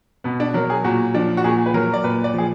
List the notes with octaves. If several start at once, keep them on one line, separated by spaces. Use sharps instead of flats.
B2 B3
D4
F#3 A#4
G#4
A#2 F#4
F3 D4
F#4
A#2 G#4
B4
F#3 A#4
D5
A#2 B4
D5
F3 G#4